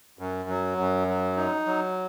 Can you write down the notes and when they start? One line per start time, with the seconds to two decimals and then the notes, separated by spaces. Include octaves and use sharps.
0.19 F#2
0.49 F#3
0.78 F#2
1.08 F#3
1.37 D#4
1.66 F#3